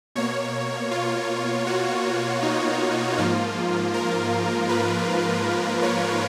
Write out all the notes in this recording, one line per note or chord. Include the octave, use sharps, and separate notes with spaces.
B2 A#3 C#5
F4
F#4
D#4
G#2 F3 A#3 F4
A#4
B4
C#5